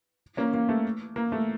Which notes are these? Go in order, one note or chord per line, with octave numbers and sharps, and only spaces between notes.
A#3 C#4
A#3
A3
A#3
A3